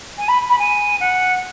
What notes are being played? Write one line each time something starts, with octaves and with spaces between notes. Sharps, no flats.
G#5
B5
B5
G#5
F#5